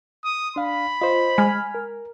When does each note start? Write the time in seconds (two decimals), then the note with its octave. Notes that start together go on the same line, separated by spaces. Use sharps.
0.25 D#6
0.56 D4 F5 B5
1.01 F4 C5 D#5
1.38 G#3 G#5 F6
1.75 A#4